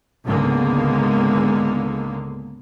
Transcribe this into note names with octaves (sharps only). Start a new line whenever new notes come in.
C#2 G#2 D3 G#3 A#3 B3